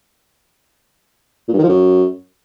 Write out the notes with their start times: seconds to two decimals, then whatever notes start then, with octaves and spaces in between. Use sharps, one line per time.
1.48 A#2
1.53 G2
1.58 D#3
1.64 F3
1.69 F#2